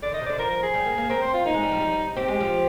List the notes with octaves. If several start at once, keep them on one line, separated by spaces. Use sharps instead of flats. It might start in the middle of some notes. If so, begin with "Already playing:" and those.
D3 D5
D#3 D#5
C3
D3 D5
F3 A#4
A#4
G#4
G3
A#3
A#3
C4 A#4
C5
F4
A#3 D#4
G#3
G3
F3
G3
C4 G4
G#3
F3